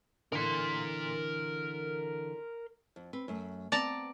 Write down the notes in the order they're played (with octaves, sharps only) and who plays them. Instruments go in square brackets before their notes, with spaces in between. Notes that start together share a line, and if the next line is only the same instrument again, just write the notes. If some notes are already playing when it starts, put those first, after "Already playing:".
[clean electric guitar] D3 E3 [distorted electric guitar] A#4 C6
[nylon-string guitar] F2
C4 B4
F#2 A3
[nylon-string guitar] B3 C4 [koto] D5 A5 A#5